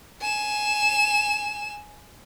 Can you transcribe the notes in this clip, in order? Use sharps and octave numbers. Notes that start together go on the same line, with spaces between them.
G#5 E7